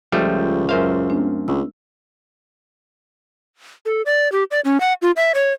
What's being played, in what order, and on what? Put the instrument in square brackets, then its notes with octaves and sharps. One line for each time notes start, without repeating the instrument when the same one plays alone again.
[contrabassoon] C#2 [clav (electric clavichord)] F3 G3 A3
[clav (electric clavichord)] F#2 C5 F5 [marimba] A#4 E5
[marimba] A3 C4 D4
[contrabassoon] C#2 [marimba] E6
[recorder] A4
D5
G4
D5
C#4
F#5
F4
E5
C#5